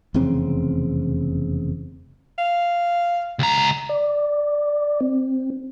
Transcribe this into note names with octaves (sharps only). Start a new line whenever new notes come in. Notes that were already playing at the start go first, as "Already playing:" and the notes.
F1 E2 C#3 C4
F5
C#2 A#5
D5
C4